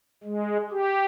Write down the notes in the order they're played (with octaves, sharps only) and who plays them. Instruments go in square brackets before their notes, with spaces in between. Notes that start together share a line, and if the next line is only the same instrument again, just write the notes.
[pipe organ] G#3
G4